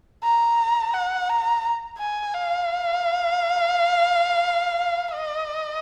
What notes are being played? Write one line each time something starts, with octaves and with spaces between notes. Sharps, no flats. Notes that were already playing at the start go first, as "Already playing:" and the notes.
A#5
F#5
A#5
G#5
F5
D#5